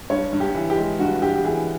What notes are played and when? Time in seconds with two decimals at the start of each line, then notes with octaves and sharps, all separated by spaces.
0.10 G2 C#5
0.33 G2
0.40 G4
0.55 E3
0.70 G4
0.77 G#3
0.99 G2 F#4
1.22 G2 G4
1.36 G4
1.44 E3 G#4